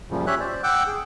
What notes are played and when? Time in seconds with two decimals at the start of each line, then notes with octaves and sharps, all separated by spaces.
0.11 F#2 A#2 C#3 F3 G3
0.27 C#4 G4 C#5 E5 F#6
0.40 C5 D5
0.63 F#5 G5 D6 E6 F#6 G6
0.87 G#4